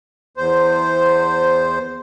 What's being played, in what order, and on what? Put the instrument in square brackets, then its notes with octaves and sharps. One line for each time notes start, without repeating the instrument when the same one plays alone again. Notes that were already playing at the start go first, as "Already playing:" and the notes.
[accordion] E2 C5